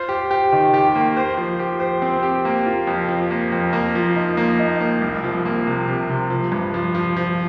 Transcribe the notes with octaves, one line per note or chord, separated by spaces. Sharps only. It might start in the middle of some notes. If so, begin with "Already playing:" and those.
Already playing: F4 C5
G4
G4
D#3
G4
A#3
C5
F3
G4
C5
C4
G4
A#3
F4
F2
F3
A#3
F2
A#3
F3
D#4
A#3
D#4
A#3
C2
F3
A#3
C3
C3
C3
F3
G2
F3
F3
F3